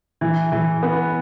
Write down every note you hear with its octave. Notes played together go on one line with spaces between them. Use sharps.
E3
E3
B3